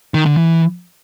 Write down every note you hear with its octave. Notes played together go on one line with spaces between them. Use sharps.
D#3
D3
E3